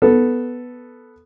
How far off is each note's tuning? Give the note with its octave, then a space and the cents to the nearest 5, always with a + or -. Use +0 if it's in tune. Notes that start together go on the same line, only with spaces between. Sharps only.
B3 +0 A4 +0